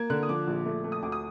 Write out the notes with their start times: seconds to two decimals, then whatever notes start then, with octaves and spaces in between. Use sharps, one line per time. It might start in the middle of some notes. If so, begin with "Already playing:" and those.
Already playing: A#3 G#6
0.10 D3 F#6
0.23 D#6
0.29 F3 D6
0.47 A#1
0.66 A3
0.84 A3
0.92 D#6
1.03 D2 D6
1.12 D#6